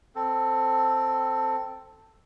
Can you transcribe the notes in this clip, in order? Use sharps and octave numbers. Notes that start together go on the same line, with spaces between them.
C4 A4